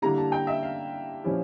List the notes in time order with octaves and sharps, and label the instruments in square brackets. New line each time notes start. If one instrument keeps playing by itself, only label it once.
[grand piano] D3 G3 A#3 E4 G4 [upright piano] A#5
[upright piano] A5
G5
E5
F5
[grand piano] A#2 F3 C#4 E4 G4